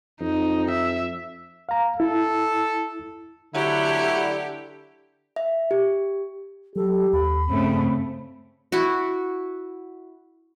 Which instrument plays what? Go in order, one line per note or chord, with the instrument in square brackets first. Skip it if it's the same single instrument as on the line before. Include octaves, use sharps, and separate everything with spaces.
[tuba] F2 [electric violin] D#4
[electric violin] E5
[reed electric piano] F5 A#5
[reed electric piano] E4 [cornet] A4
[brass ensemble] D3 [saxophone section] F#3 A3 F#5 [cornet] E4 [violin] G4
[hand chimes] E5
G4
[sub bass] F#3 [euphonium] G4 [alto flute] A4
[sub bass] D#2 [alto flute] B5
[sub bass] G2 [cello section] C#3 A3 [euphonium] C4
[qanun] E4 F#4